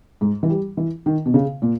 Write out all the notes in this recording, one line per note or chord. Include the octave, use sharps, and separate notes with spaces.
G#2
E3
G3
E3
D#3
B2
C#3
A#2